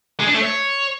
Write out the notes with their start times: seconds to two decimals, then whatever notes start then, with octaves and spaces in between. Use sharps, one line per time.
0.20 G#3
0.27 D4
0.34 A3
0.41 C#5